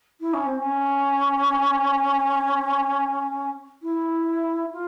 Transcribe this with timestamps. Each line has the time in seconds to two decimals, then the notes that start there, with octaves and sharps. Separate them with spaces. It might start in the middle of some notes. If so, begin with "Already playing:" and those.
0.20 E4
0.33 C#4
0.45 C4
0.58 C#4
3.82 E4
4.72 F4